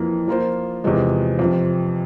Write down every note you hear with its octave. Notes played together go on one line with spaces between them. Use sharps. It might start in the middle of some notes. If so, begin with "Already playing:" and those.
Already playing: F2 E3 A#3
F3 A#3 F4 C5
E2 C3 F3 G#3
F2 C3 F3